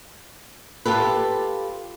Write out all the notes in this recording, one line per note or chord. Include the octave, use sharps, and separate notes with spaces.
F4 G4 A4 B4